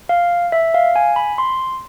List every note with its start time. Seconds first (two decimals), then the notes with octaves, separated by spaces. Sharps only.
0.09 F5
0.52 E5
0.74 F5
0.96 G#5
1.16 B5
1.38 C6